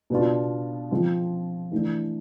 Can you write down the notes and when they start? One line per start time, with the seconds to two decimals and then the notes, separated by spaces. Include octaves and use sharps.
0.10 B2 B3 D4 F4
0.91 F3 C4 F4
1.72 E3 A3 D4